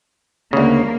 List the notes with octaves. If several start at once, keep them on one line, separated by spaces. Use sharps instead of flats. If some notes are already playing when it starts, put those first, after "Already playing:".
D2 C#3 A#3